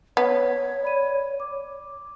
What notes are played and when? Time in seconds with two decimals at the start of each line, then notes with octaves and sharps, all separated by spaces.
0.17 B3 C#5 B6
0.83 D5 B5 D#7
1.40 D6